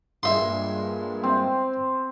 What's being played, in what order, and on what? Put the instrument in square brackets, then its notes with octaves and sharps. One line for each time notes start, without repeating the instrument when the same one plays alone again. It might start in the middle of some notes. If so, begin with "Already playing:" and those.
[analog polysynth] G2 A#2 G#3 [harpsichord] E5 C6
[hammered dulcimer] C4